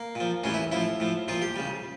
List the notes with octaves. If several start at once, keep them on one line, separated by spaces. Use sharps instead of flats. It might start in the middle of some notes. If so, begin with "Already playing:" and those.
Already playing: A#3
A#2 F3
A2 E3 G3 C#4
E4
A2 F3 E4
A2 F3
A#2 F3 F4
G4
C#3 G3